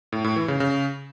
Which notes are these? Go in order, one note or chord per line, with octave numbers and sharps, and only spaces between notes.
A2
A2
E3
C#3
C#3